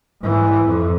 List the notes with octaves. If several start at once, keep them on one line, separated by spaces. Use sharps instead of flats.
G#2 E3
F2